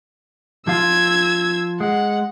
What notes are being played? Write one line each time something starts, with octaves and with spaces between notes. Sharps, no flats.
F3 F4 E6 G#6
G#3 F#5